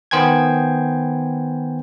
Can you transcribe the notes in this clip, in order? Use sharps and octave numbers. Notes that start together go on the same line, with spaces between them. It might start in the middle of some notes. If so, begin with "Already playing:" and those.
D#3 B3 C5 G5 G#5 G#6